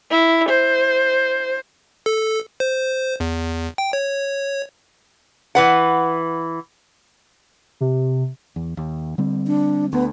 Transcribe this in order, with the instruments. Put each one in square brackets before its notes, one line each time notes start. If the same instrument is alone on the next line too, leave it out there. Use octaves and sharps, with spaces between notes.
[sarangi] E4
C5
[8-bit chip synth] A4
C5
E2
G5
C#5
[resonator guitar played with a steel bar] E3 B4 F#5
[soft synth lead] C3
[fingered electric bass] E2
D#2
D3 G3 C4
[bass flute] D4
[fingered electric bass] D2 [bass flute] B3